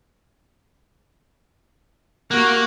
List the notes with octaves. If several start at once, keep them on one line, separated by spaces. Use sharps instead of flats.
A#3 F#4 F#5